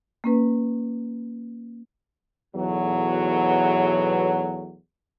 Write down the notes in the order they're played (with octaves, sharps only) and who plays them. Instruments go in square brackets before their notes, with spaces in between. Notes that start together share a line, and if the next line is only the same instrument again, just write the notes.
[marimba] A#3 C#4 B4
[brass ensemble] B1 E2 A2 F#3